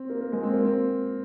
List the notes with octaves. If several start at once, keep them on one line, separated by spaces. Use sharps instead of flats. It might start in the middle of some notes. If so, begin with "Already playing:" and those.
Already playing: C4
A#3
A#3
G#3
C4
A#3
C4